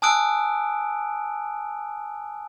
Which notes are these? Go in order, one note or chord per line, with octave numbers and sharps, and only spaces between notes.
G#5 A5 D#6 E6 F#6 D7